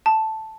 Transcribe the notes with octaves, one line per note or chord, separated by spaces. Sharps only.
A5